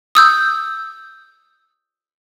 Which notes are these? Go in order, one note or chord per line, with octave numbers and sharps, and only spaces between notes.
D#6 E6 G6